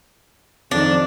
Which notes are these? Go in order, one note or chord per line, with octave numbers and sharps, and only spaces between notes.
F2 D#3 D4